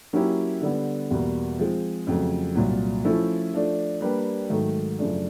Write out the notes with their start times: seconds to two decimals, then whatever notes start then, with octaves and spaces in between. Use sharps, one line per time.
0.13 F#3 A#3 C#4 E4 G4
0.62 D3 G3 B3
1.10 E2 B2 G3 A#3
1.59 F3 G#3 C4
2.07 F2 C#3 F#3 A3
2.56 C2 A#2 F#3
3.04 F3 A3 C#4 E4 A4
3.53 F3 A3 D4
4.01 G3 A#3 D4 G4 B4
4.50 G#2 D#3 F#3 A3
4.98 F#2 C#3 F3 A3 D4